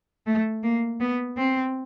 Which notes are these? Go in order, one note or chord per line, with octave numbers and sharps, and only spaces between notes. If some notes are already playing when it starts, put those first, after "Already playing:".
A3
A#3
B3
C4